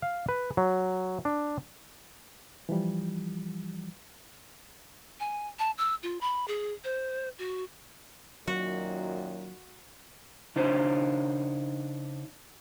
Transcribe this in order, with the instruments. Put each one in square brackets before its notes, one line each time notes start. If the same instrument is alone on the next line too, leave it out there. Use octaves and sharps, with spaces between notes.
[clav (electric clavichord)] F5
B4
F#3
D4
[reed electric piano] E3 F3 G3
[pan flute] G#5
A5
E6
F4
B5
G#4
C5
F#4
[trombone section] F#2 A#2 D#3 [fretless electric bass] F#3 [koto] F#4
[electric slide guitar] C#3 D4 D#4 C5 C#5